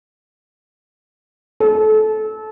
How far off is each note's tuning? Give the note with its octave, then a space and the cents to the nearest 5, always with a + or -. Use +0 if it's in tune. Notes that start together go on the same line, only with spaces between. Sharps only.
A4 -25